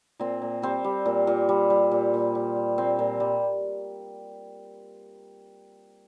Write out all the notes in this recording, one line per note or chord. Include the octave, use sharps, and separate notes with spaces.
A#2 C4
A#2
G3 C4
G3
A#2
A#2
G3
G3
A#2
A#2
G3
G3
A#2 C4
A#2
G3